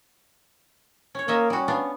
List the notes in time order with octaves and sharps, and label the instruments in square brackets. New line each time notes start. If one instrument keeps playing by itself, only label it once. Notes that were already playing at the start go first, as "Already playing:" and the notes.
[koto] C#4 C#5
[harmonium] A#3 A#4 [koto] C#4 D#5 E5
[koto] G3 F#4 [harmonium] C#4
[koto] B3 D4 F4